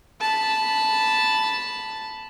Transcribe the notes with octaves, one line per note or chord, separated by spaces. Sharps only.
A5 B5